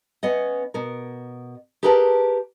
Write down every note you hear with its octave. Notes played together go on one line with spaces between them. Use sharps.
B3 C#4 D#5
B2 A#4
G4 G#4 A#4 B4 F#5 A5